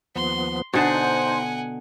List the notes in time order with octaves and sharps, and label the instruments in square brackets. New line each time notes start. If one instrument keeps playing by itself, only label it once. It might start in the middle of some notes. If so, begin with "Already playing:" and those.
[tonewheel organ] D#2 F3 B3 [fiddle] C6
[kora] B2 D3 [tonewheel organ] D#4 [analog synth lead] C5 [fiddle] F#5 G#5